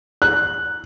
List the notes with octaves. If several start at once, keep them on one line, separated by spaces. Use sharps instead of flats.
F#6